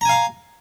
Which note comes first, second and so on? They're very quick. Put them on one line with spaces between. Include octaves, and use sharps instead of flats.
A#5 G#5 F5